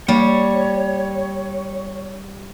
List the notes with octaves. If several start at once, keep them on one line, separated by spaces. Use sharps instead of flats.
G3 A#3 C#5